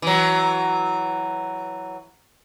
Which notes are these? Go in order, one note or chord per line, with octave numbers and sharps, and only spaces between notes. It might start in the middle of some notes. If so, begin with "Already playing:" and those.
E3 F#3